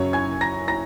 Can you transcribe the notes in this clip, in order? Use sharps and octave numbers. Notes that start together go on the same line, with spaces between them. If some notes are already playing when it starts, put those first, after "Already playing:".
Already playing: F#2 C#3 F#3 C#5 C#6
G#5 G#6
A#5 A#6
A#5 A#6